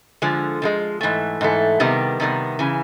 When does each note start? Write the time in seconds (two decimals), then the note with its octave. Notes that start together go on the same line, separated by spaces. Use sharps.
0.22 D3 F3 G#3
0.62 D3 F3 G#3
1.01 G#2 E3 A3
1.41 G#2 E3 A3
1.80 C3 D#3 G3 B3
2.20 C3 D#3 G3 B3
2.59 C#3 E3